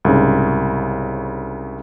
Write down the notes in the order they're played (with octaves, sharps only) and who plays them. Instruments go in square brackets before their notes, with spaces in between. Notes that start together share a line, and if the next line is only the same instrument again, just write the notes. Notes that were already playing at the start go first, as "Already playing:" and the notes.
[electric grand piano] C2 G#2 C#3